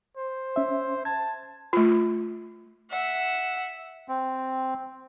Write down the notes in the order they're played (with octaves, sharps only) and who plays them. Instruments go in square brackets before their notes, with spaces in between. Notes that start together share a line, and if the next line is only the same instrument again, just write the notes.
[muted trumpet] C5
[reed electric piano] C#4 E5
[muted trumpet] A5 [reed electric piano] G#6
[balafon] A3 F4
[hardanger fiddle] E5 F#5
[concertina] C4